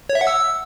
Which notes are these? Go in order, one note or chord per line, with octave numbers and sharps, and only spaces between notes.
C#5
E5
F#5
E6